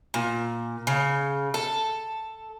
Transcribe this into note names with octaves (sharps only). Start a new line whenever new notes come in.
A#2
C#3
A4